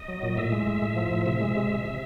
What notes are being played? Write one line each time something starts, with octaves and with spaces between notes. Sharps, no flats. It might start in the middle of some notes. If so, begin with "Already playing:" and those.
Already playing: D#5
F#3
A#2
A2 E5
G#3
A2
A2
F3
A2
C3 E5
G#3
C3
C3
C3